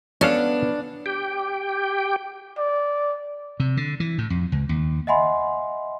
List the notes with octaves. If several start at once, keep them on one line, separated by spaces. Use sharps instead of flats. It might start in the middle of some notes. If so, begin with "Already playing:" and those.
B3 C#4 D4 A4 F5
G4 G5
D5
C3
D3
E3
A2
F2
C#2
D#2
D#5 E5 F#5 G#5 B5 C6